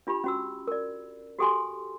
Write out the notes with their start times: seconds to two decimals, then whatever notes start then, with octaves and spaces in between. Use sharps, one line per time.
0.07 D4 F4 G4 B5
0.24 C#4 F#4 E6
0.67 A#4 D5
1.39 F#4 G4 A4 G5 G#5 C6